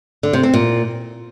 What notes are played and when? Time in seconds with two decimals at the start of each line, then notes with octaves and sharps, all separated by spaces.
0.23 D3
0.33 C3
0.43 C4
0.54 A#2